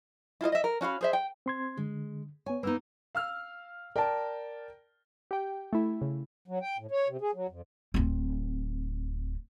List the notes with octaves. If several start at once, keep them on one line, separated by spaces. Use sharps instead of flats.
E4 F4 A4 D#5
D#5 E5
A#4
C#4 F#4 F5 B5
G#4 C5 E5
G5
C4 C6 G#6
D3 G#3
B3 C#5 G#5
A#3 B3 D#4 B4 E6
F5 E6 F6
A#4 D5 G5 A5
G4 G5
A3 E4
C#3
F#3
G5
A2
C#5
C3
G#4
F#3
F2
D1 C4